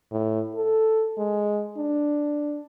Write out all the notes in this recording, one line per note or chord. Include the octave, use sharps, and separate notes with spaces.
A2
A4
G#3
D4